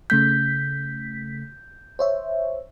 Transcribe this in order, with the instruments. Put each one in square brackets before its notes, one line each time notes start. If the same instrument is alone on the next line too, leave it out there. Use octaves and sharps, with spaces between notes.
[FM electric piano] C#3 A3 B6 [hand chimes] G6
[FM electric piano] C5 C#5 E5